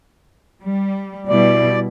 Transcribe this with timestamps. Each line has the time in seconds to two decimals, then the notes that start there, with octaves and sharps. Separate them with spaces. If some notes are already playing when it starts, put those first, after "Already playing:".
0.61 G3
1.29 B2 G3 E4 D5